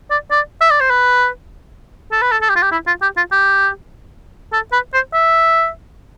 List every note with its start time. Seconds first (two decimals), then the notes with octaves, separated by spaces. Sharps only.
0.11 D5
0.31 D5
0.61 E5
0.71 D5
0.80 C5
0.90 B4
2.12 A4
2.22 B4
2.32 A4
2.42 A4
2.49 G4
2.56 F4
2.62 G4
2.72 E4
2.87 F4
3.02 G4
3.17 F4
3.32 G4
4.53 A4
4.72 B4
4.93 C5
5.14 E5